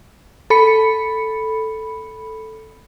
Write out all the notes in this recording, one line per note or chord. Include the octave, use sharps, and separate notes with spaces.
A4 B5 C#7